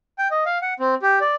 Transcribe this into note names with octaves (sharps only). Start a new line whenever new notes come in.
G5
D#5
F5
F#5
C4
G4
D5